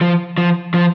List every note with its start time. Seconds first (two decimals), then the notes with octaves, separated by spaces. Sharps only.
0.01 F3
0.38 F3
0.74 F3